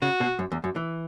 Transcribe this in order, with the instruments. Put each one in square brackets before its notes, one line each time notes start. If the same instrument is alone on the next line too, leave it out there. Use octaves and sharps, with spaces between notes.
[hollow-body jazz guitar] C#3 [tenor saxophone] F#4
[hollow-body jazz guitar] B2
F#2
E2
F#2
E3